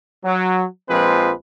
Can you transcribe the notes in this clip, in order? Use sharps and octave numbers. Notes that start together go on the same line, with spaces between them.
F#3
A#1 F3 G#3 C4 B4